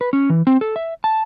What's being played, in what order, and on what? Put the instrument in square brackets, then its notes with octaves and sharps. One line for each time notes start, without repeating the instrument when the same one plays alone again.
[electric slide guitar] B4
C#4
E3
C4
A4
E5
A5